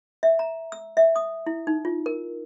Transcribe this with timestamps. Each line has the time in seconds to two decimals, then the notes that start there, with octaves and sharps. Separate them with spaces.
0.23 E5
0.39 A#5
0.72 E6
0.97 E5
1.16 D#6
1.47 E4
1.67 D#4
1.85 F4
2.06 A#4